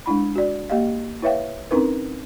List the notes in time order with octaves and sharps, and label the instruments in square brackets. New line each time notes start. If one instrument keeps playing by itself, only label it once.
[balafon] G#3 D4 E4 B5
F#4 D5
A#3 G4 D#5 F5
E4 B4 C#5 E5 F5 G5
C4 C#4 D#4 E4 A#4 B4